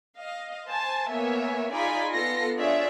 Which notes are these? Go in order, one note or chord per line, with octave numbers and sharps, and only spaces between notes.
D#5 F5
C5 G#5 A5
A#3 B3 C#5 E5 G#5
D#4 F4 G#4 D5 G#5 B5
B3 F4 A4 A#6 C7 C#7
D4 F4 G#4 C#5 D5 E5